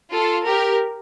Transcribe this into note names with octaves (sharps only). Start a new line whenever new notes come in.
F4 A4
G4 A#4